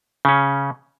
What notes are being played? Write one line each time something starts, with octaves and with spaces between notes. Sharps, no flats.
C#3 C#4